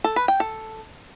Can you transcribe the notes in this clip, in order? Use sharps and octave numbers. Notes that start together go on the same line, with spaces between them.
A4
B4
G5
A4